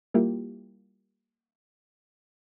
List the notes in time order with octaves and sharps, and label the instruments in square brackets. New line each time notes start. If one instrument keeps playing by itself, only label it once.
[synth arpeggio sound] G3 A#3 E4 F4 G4